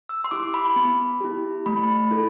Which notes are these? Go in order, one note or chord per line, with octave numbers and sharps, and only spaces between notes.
E6
C6
E4 G4 D6
B5
B3
E4 G4
A3 B5
E4 A4